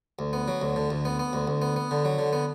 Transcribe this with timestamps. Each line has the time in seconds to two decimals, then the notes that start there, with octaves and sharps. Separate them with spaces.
0.19 D2
0.33 B3
0.48 F#3
0.62 D2
0.76 D3
0.91 D2
1.05 B3
1.19 B3
1.33 D2
1.47 D2
1.62 B3
1.76 B3
1.91 D3
2.05 F#3
2.19 D3
2.33 B3